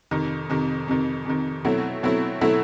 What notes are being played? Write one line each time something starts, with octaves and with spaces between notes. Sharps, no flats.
F2 C3 D#3
F2 C3 D#3
F2 C3 D#3
F2 C3 D#3
B2 F#3 A3 C4 E4
B2 F#3 A3 C4 E4
B2 F#3 A3 C4 E4